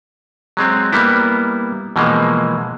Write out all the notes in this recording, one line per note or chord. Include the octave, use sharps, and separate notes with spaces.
F#3 G#3 C4
G3 A#3 B3 E4
B2 E3 F3 G#3 A#3